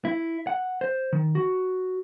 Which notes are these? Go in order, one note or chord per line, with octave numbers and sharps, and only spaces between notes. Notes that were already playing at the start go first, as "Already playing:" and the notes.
E4
F#5
C5
D#3
F#4